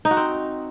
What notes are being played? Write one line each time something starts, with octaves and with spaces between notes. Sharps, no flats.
D#4
F#4
C4